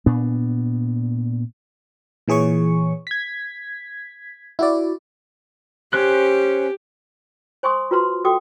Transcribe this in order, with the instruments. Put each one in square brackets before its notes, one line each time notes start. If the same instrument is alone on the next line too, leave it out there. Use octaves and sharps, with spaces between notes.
[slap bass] A#2 B3 D4
[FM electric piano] A#2 E3 G#4 C#5 C#6
G#6 B6
E4 F#4 D5
[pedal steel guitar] C#4 C5 F#6 [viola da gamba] G4
[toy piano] C5 G#5 C6 C#6 D#6
F4 F#4 B4 A#5 C6
F#4 A4 G5 D6 D#6